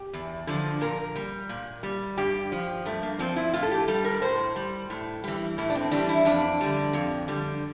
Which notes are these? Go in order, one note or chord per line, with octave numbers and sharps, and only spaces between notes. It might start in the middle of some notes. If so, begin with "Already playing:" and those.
Already playing: G4
E2
D3 F3
A#2 A#4
G3
A#2
G3
G2 G4
F3
G2 A3
A#3
F3 C4
E4
A2 F4
A4
G4
G3 A4
A#4
A2 C5
G3
A2
E3 G3
A2 E4
D4
C4
E3 G3 D4
E4
F2 D4
D3 G3
F2
D3 G3